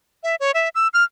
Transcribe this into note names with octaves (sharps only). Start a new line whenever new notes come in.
E5
C#5
E5
E6
F6